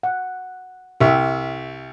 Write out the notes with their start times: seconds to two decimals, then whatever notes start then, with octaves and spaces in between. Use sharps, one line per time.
0.03 F#5
1.01 C2 G4 E5